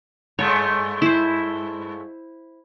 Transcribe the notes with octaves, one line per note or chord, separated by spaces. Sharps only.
G2 G#3 A3 C#5
E4 C5